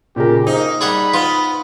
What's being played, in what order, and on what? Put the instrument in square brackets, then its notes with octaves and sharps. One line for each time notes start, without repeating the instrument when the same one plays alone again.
[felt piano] A#2 C#3 A#4 [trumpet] G4
[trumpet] A#3 [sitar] D#4 [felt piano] C5
[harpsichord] G3 G#4 F#5 [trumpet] B5
[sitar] B3 [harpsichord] F4